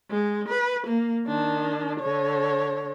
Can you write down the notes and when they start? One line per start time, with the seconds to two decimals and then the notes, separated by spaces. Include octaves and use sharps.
0.10 G#3
0.48 B4
0.87 A#3
1.26 D#3 D4
2.00 D3 C#5